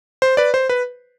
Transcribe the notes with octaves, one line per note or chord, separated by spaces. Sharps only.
C5
B4 D5
C5
B4